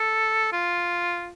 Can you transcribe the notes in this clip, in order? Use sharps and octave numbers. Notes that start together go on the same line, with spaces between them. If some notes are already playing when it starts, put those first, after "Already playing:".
Already playing: A4
F4